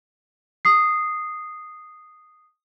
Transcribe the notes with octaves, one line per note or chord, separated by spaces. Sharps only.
D#6 C7